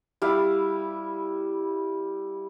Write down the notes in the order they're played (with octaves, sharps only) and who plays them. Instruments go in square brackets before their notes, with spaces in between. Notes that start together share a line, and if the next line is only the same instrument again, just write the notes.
[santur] G3 E4 F5 B5